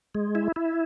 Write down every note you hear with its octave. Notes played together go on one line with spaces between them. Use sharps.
G#3
E4
E4